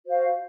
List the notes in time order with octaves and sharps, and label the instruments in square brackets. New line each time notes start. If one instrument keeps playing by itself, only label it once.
[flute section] F#4 C5 F5